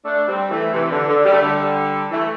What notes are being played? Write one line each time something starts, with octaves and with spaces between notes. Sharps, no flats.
A3 D4
A3
G3 C4
E3 A3
C3 E3
D3
D3
G3
A3
D3 G3
E3 A3